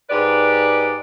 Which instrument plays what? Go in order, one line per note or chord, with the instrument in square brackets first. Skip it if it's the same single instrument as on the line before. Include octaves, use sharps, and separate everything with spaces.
[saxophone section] G#2 G4 B4 D5